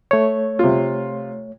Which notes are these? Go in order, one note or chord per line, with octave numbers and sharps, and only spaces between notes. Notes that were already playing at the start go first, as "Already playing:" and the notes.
A3 C#5
C3 F4